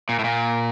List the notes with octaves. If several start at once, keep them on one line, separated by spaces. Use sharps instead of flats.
A#2
A2
A#2